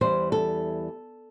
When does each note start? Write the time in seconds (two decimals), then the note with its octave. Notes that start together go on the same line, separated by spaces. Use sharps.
0.01 E2 E3 G3 C5
0.32 A4